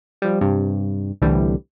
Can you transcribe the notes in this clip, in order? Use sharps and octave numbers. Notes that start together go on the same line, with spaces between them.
F3 G3
G2 C3
C2 A2 D3 E3 G3